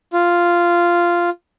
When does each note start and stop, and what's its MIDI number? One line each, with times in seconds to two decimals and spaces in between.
0.14 1.30 65